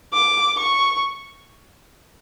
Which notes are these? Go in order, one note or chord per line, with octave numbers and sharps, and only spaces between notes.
D6
C#6